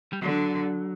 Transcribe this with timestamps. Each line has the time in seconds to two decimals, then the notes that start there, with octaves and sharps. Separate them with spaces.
0.13 G3
0.22 D3 F#3